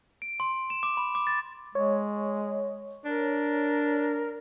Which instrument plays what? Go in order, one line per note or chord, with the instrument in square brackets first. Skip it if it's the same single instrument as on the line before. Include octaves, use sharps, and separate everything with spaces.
[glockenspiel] D7
C6
E7
D6
B5
D6
A6
[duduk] G#3 [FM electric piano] C#5
[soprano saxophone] D4 [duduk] A#4